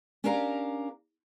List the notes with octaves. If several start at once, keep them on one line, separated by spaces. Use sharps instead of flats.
C#4 D4 G4 A#4 F5 A#5